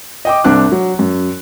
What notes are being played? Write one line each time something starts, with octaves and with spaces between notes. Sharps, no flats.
D#5 G5 D6
C2 C4 D4 D6 F#6
F#3
F#2